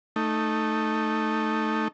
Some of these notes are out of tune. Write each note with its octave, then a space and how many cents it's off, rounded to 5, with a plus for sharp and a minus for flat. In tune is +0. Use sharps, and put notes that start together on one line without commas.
A3 +0 D#4 -5